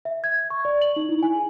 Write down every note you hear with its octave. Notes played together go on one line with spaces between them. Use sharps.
E5
G#6
C#6
D5
F#7
D#4
E4
G#5
G#4